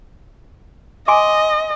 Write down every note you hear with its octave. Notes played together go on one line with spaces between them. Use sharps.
D#5 G#5 C6 D6